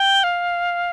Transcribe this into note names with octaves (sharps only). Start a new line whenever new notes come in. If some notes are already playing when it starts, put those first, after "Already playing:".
Already playing: G5
F5